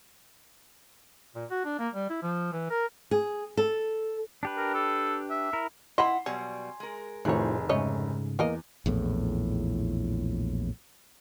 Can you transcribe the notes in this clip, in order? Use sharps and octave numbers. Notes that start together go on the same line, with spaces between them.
A#2
F#4
D4
A#3
G3
E4
F3
E3
A#4
G#4
A4
D4 G4 B4
A#4
A4
E5
E4 A#4
E4 D#5 F#5 B5 C6
B2 F#3 G3 C#5 G#5
G#3 A#4
F1 A2 D#3 E3 F4 G#4 C5 C#5
G#2 C#3 A3 C#5 D#5
E2 A#3 A#4 D#5
A#1 E2 A2